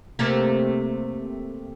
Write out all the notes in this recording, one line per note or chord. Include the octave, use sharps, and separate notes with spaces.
C3 A3 A#3